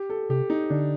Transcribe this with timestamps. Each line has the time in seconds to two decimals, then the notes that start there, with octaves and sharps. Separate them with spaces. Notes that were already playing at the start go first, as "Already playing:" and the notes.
Already playing: G4
0.10 A4
0.29 C3 G4
0.50 D#4
0.70 D3 D4